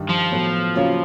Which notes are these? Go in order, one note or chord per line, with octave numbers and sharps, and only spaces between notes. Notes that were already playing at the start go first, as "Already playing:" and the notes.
Already playing: G2 D#3 G3
F3
A2 F#3 B3
C#3 F#3 A#3 C#4 F4